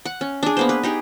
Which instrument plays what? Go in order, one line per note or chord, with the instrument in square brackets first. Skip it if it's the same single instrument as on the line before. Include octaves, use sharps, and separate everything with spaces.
[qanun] F#5
C#4
D4 G#4
A#3 B3 C5
B4
D#4 G4 G#4